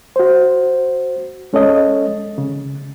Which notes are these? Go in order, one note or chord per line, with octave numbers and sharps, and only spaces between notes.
F#4 C5
G#3 C#4 A4 C#5 D#5
C#3